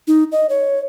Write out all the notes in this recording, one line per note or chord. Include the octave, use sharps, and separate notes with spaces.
D#4
D#5
C#5